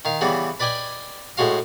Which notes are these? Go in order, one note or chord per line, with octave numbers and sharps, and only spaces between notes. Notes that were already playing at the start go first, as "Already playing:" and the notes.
D#3 F5
C#3 E3 G3 B3
B4 D5 D#5 G5 G#5
A2 G#3 F#4 F5